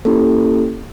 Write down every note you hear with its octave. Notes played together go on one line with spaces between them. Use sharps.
A#3 C#4 E4 G4 A4